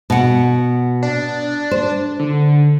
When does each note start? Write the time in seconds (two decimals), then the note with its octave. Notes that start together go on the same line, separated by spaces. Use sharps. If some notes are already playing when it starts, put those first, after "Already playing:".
0.10 B2 F#5
1.03 D4
1.71 C5
2.19 D3